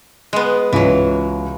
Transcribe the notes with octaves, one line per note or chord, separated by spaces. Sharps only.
G#3 B3
C#2 E3 F#3